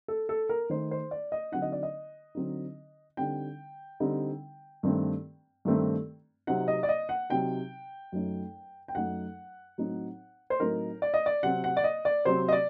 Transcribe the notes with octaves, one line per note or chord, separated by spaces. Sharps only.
A4
A4
A#4
D#3 A3 D#4 C5
C5
D5
D#5
D3 F#3 C4 D#4 F#5
D#5
D5
D#5
D3 F#3 C4 D#4
D3 G3 C4 D#4 G5
D3 G3 C4 D#4
G2 D#3 A3 C4
G2 D#3 A3 C4
C3 F#3 C4 D#4 F#5
D#5
D5
D#5
F#5
C3 F#3 C4 D#4 G5
F#2 F#3 A3 D#4
G5
F#2 F#3 A3 D#4 F#5
A2 F#3 C4 D#4
C5
A2 F#3 C4 D#4 A#4
D5
D#5
D5
C3 F#3 C4 F#5
F#5
D5
D#5
D5
C3 F#3 C4 C5
D#5
D5